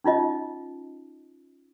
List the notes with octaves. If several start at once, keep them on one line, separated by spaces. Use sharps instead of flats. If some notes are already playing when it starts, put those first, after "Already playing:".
C#4 D#4 F4 D#5